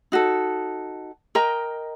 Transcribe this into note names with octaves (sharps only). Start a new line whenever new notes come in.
D#4 F#4 A4
A#4 D#5 G5 A#5